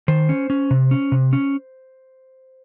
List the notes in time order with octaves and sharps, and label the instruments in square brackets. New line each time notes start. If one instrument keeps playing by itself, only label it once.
[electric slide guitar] D#3 C5
C#4
C#4
C3
C#4
C3
C#4